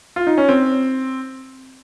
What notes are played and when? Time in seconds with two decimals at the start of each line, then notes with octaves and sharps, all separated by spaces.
0.16 F4
0.27 D#4
0.38 C#4
0.49 C4